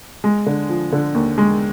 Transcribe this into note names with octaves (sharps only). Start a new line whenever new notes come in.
G#3
D3
F3
D3
D#2
G#3